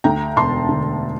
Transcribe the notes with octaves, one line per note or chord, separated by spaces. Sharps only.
D2 G5 A#5
E1 A5 C6
D3